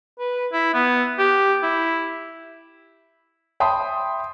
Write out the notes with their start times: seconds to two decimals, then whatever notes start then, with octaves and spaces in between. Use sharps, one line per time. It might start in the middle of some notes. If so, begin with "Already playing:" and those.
0.19 B4
0.52 E4
0.74 B3
1.19 G4
1.63 E4
3.60 E5 G5 A5 B5 C6 D#6